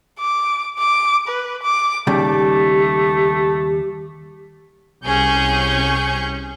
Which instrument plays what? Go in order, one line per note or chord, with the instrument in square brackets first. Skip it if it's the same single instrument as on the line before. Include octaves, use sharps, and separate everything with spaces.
[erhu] D6
D6
B4
D6
[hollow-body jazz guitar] D#2 C#3 G3 [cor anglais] A3 [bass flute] G4
[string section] C2 C#4 G#4 C#6 G6